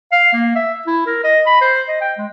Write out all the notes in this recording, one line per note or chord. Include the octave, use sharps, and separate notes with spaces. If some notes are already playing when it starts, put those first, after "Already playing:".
F5
A#3
E5
E4
A#4
D#5
B5
C5
D#5
G5
G#3